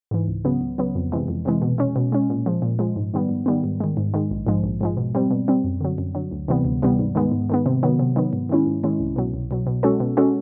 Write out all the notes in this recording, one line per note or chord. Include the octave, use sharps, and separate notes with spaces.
G#2 E3
C#2
C#3 F#3 B3
C#2
C#3 F#3 B3
F2
C3 E3 G#3
F2
C3 E3 G#3
B2
G#3 C#4
B2
G#3 C#4
A#2
F3 G#3
A#2
F3 G#3
G#2
D#3 G3 B3
G#2
D#3 G3 B3
G#2
D#3 G#3
G#2
D#3 G#3
A#1
G#2 F3 G#3
A#1
G#2 F3 G#3
B2
G3 C4
B2
G3 C4
F#2
D3 F#3
F#2
D3 F#3
D2
C3 E3 G3 B3
D2
C3 E3 G3 B3
G#2
D#3 G#3 B3
G#2
D#3 G#3 B3
C3
D#3 F#3 B3
C3
D#3 F#3 B3
G#2
D#3 G#3 C#4 E4
G#2
D#3 G#3 C#4 E4
C2
B2 F#3
C2
B2 F#3
B2
G#3 C#4 F#4 A4
B2
G#3 C#4 F#4 A4